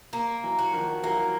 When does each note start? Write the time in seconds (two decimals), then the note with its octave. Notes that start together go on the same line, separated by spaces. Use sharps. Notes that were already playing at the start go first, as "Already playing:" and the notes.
0.13 A#3
0.44 E3 F#3
0.59 F#4
0.73 D#3 F3
1.03 E3 F#3 A#3